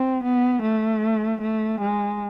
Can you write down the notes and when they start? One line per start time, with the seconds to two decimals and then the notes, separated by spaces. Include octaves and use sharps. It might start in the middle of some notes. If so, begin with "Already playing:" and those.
Already playing: C4
0.24 B3
0.62 A3
1.41 A3
1.80 G#3